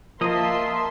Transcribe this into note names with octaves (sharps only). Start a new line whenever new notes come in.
F3 A#3 F4 A#4 D#5 E5 A5 C6